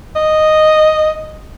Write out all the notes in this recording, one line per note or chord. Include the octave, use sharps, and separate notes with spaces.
D#5